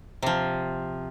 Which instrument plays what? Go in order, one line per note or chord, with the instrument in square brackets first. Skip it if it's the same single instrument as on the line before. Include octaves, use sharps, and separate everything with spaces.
[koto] C3 F3